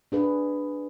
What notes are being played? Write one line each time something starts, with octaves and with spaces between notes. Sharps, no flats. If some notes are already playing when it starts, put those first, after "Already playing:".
D4 G#4 B4